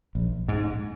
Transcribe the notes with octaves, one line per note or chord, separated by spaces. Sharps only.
A#1
G#2